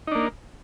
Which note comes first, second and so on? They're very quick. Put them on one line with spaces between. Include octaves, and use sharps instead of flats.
D#4 D4 A#3